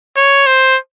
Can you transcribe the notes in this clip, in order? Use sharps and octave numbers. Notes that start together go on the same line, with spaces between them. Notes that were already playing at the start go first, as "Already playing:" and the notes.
C#5
C5